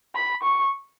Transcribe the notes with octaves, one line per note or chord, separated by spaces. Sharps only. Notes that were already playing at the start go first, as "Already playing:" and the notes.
B5
C#6